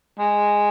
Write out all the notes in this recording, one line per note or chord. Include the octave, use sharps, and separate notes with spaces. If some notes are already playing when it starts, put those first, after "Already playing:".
G#3